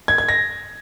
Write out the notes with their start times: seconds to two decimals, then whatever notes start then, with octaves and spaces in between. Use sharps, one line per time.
0.08 G#6
0.18 G#6
0.29 A#6